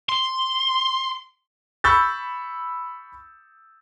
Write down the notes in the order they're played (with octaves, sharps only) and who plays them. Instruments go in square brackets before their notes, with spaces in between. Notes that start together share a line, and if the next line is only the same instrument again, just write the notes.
[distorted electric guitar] C6
[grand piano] B5 C#6 E6 G6 A6